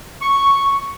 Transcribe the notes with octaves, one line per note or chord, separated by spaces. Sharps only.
C#6